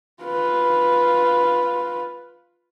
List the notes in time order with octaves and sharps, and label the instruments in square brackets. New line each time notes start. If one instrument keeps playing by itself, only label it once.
[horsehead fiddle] F4 B4